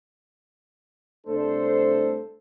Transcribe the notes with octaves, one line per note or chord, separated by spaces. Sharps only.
C2 A3 D4 A4 C5